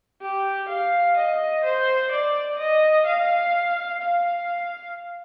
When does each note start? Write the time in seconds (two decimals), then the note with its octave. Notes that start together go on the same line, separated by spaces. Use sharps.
0.21 G4
0.68 F5
1.16 D#5
1.64 C5
2.11 D5
2.58 D#5
3.06 F5
4.02 F5